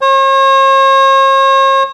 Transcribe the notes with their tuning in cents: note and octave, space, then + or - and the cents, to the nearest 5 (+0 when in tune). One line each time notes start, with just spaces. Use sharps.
C#5 -45